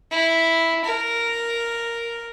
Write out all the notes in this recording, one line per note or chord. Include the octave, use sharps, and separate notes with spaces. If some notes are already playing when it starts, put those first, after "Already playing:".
E4
A#4